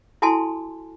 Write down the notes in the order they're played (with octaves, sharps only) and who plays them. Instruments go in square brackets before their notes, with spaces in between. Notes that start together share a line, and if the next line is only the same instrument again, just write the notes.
[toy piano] E4 F#4 A4 G#5 A5 C6